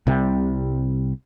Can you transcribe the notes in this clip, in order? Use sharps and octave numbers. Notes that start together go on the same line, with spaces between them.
C2 C3 G3